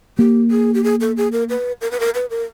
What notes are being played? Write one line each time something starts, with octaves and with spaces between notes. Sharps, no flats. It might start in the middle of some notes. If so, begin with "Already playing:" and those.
A#3 G4
G#4
G4
G#4
A4
G#4
A#4
B4
A#4
B4
A#4
B4
A#4